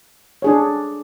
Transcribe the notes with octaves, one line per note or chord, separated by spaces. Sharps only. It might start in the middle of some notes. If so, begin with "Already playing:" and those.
D4 G#4 C#5